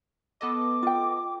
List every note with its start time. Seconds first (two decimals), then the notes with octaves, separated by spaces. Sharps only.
0.41 B3 A4 D#5 D6
0.83 F4 G5